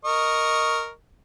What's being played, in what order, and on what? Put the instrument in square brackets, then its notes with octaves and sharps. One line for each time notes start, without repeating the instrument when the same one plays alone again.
[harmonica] A#4 D#5 C#6